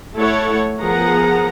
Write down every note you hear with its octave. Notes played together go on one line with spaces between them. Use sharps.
A3 E4 A4 C#5 F#5
F3 B3 G#4 A#4 F#5 A#5